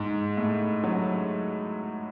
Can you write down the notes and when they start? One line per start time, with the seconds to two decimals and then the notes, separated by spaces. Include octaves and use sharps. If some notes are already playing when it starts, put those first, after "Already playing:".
Already playing: G#2
0.37 A2
0.84 F#3